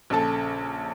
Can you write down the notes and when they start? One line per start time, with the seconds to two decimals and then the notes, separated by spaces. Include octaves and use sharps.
0.10 A#1 C#3 A4 A5